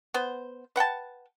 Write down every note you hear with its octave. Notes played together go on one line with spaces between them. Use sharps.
B3 C5
B4 F#5 G5 A5